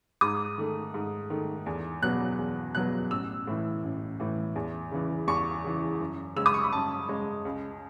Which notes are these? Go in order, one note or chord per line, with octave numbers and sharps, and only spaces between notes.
G#2 D#6
D#3 A3
G#2
D#3 A3
E2
B2 F#3 B3 F#6
E2
B2 F#3 B3 F#6
A1 E6
A2 E3
A1
A2 E3
E2
C#3 E3
E2 C#6
C#3 E3
F#2
C#3 G#3 C#4 E6
D#6
C#6
B5
F#2 A5
C#3 G#3 C#4
C#2